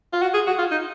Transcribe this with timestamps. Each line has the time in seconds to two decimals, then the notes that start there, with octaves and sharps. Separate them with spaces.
0.13 F4
0.22 F#4
0.34 G#4
0.47 F#4
0.59 F4
0.71 D#4